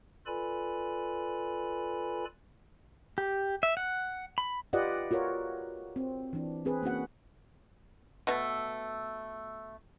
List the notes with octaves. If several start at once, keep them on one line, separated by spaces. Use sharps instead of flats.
F4 A4 B4 D5 G#5 B5
G4
E5
F#5
B5
F4 G4 B4 D5 D#5 F#5
F4 F#4 A#4 C#5
C4
E3 D4
C4 G#4 B4
A#3 C#4 F#4 F#5
B2 A3